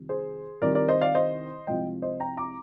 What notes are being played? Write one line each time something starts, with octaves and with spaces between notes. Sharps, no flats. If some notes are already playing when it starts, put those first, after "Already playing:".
Already playing: F2 C3 D#3 G3
G#4 C5
C2 C3 D#3 G3 A#4 D5
A#4 D5
C5 D#5
D5 F5
C5 D#5
C2 C3 F3 G#3 D#5 G5
C5 D#5
G5 A#5
A#5 D6